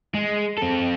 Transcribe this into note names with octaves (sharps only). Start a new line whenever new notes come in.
G#3
C4 A4